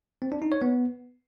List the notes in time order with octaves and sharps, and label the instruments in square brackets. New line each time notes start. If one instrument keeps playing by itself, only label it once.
[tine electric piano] C4
D4
D#4
C#5
B3